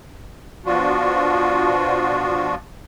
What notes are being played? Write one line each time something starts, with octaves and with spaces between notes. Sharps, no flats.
B2 F3 D4 F4 F#4